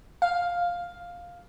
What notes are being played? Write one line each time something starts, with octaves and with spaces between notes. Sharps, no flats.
F5